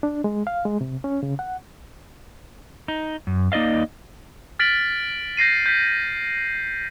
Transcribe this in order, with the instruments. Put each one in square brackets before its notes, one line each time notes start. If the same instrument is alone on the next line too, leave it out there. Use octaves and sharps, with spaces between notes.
[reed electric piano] D4
G#3
F5
G#3
C3
C#4
C#3
F#5
[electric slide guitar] D#4
F#2
A#3 D#4 D5 D#5 F5
[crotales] F6 A6 B6 D7 F#7
G6 A#6 C7 D#7
G6 B6